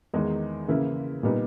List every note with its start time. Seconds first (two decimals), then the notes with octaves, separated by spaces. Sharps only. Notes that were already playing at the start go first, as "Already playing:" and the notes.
0.13 E2 D#3 G#3 D#4
0.68 C#3 E3 A#3 E4
1.23 A#2 G3 B3 D#4